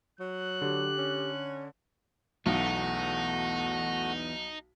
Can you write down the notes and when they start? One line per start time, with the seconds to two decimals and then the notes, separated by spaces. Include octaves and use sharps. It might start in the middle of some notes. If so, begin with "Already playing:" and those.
0.20 F#3 F#6
0.62 D3 G4
0.98 C#4
2.46 B1 E3 A3 B3 D#4 F#4